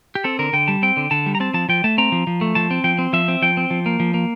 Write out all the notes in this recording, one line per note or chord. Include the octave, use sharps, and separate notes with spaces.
G4
C4 A4
D3 A#4
D3 G5
G3 A5
C4 G5
D3
D3 A5
G3
A#5
C4 A5
F3 A5
F3 G5
A3 A5
C4 A#5
F3
F3
A3
F3 A5
C4
F3 G5
C4
F3 E5
C4
F3 G5
C4
F3
A#3
F3
A#3